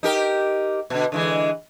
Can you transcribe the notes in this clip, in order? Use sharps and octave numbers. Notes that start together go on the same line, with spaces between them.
D#4 G4 A#4
B2 D3
D3 E3 G#3